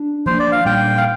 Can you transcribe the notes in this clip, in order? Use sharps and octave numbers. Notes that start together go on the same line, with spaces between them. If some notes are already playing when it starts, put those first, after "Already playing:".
Already playing: D4
F3 A#3 D4 C5
D5
F5
A#2 G3 A#3 G5
F5